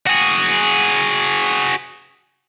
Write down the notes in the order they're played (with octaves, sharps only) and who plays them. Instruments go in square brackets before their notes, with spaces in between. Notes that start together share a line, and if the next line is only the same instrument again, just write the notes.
[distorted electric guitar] F#4 G#4